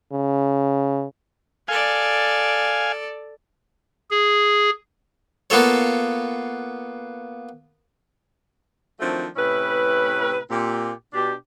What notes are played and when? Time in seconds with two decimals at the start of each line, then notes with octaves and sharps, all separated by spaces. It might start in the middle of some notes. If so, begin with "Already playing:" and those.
0.12 C#3
1.68 A4 D5 F5 G#5
4.11 G#4
5.50 A#3 B3 F4 A4 C#5
8.99 D#3 F3 F#3 A3 C4 D4
9.36 A2 C3 C#4 E4 B4
10.50 A#2 C4 G4
11.13 B2 D4 G4